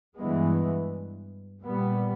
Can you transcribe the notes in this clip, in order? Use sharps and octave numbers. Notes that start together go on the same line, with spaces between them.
G2 E3 G#3 B3
A#2 G3 B3